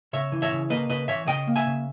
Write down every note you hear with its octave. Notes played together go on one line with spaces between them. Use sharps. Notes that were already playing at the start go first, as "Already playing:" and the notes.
C#3 C#5 E5
E3
C#5 E5
C#3
A#3 B4 D#5
C#3 B4 D#5
E3 C#5 E5
C#3 D#5 G5
A#3
E5 G#5
C#3